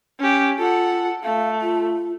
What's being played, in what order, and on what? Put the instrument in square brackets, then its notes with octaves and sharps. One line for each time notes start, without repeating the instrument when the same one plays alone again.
[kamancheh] C#4 G4
[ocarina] F4 [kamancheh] A4 F#5
[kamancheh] A3 [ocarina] F5
[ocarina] F4